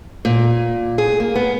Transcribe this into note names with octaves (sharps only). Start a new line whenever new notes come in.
A#2
G#4
A#3
B3